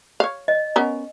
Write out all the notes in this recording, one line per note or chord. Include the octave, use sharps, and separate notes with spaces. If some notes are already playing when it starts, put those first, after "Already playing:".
C#5 F5
D#5
B3 C#4 A#4